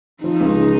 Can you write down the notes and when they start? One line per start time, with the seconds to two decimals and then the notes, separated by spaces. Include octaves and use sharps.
0.23 F3 D#4
0.41 C#2
0.57 C#3